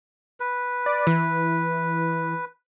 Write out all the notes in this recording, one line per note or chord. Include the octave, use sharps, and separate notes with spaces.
B4
D5
E3